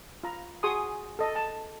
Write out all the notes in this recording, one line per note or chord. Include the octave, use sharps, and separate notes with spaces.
F4 A#5 B5
F#4 G#4 G#5 C6 C#6 D#6
A4 D#5
A5